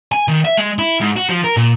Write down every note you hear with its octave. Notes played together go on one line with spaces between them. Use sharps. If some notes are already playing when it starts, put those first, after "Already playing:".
G#5
D#3
E5
G#3
E4
G#2
F#4
F3
A#4
A#2